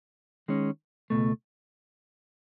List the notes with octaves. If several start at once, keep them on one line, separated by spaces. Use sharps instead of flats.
D#3 G#3 C#4
C#2 B2 A3